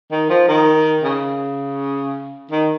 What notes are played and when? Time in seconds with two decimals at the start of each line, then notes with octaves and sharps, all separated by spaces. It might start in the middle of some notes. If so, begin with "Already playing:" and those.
0.12 D#3
0.30 F3
0.48 D#3
1.03 C#3
2.51 D#3